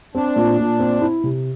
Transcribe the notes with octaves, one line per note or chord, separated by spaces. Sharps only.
C4 D4
A#2
A#2
C4
E4
C3